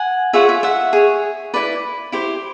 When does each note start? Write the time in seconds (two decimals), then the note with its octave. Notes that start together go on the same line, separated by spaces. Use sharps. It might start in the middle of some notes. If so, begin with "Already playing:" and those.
Already playing: F#5 G#5
0.33 F4 G#4 C#5 E5 F#5
0.49 E5
0.63 E5 F#5
0.93 G#4 C#5
1.54 E4 G#4 B4 D5
2.12 E4 G4 C5